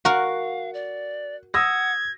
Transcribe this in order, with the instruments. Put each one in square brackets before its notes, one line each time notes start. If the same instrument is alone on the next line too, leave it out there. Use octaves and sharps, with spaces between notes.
[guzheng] F#4 A#4 [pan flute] F5 [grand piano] F#5
[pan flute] D5
[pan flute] F#5 [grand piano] D#6 E6 A#6 [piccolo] G#6